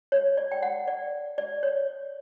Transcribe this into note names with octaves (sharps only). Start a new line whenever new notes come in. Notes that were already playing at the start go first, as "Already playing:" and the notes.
C#5
D5
G5
F#5
D5
D5
C#5